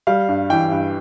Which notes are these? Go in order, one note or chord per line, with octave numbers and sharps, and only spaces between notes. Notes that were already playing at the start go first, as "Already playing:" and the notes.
G3 F5
G2
E3 G5
G2